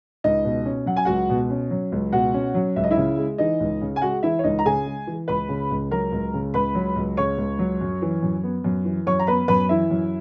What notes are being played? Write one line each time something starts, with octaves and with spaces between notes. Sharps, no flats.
C#2 D#4 D#5
B2
C#4
F#3 F#5
G#5
C#2 F#4 F#5
B2
C#4
F#3
C#2
B2 F#4 F#5
C#4
F#3
C#2 E5
D#5
E4 E5
C#3
G#3
E3 D#4 D#5
C#2
C#3
G#5
G#3 F#4 F#5
E3 E4 E5
C#5
C#2 D#4 D#5
A#5
C#3 G#4 G#5
G#3
E3
C#2 B4 B5
C#3
C#2
F#3 A#4 A#5
C#2
C#3
C#2 B4 B5
F#3
C#2
C#3 C#5 C#6
C#2
F#3
F#2
E3
F#2
B3
F#2
E3
F#2 C#5 C#6
A#5
B3 B4 B5
F#2 B4 B5
E3 E4 E5
F#2